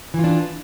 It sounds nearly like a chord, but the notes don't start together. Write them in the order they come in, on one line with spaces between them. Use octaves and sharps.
E3 F4 D4